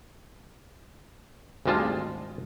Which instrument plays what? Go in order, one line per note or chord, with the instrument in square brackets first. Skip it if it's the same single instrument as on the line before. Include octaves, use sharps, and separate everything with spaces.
[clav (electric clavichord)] G#1 D2 G3 G#3 F4 A5